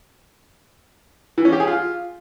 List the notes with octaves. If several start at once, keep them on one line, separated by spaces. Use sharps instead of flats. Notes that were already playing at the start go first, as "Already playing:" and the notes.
E3
C#4
G4
G#4
F4